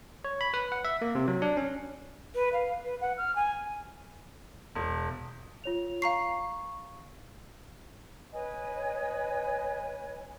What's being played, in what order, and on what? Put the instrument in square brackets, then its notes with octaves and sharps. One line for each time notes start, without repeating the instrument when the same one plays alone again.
[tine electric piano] C#5
B5
B4
F#5
E5
A#3
C3
F#3
D4
C#4
[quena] B4
F5
B4
F#5
F6
G#5
[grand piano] E1
[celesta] F4 C#5 F7
[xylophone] F5 A#5 C7 [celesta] C#6
[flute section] B4 C#5 D#5 G#5